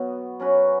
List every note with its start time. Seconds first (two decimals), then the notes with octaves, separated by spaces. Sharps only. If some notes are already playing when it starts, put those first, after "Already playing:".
Already playing: B2 F#3 B3 F#4
0.40 F#3 C#4 F#4 B4